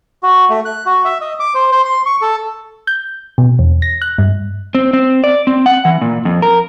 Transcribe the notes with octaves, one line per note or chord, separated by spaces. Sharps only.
F#4
A3
F#6
F#4
E5
D#5
D6
C5
C5
C6
C#6
A4
G6
B2
E2
A#6
F#6
G2
C4
C4
D5
C4
F#5
E3
A#2
F2
A#4